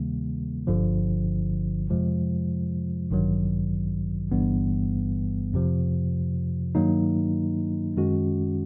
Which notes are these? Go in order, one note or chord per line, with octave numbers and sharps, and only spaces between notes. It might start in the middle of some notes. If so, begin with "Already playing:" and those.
Already playing: D2 C3 D#3 G3 A#3
G1 G2 D3 F3
F2 C3 F3 G#3
A1 G2 D#3 F#3
G1 G2 E3 G3 B3
F2 C3 F3
G2 D#3 F#3 A#3 D#4
F#2 D#3 G#3 C#4 F#4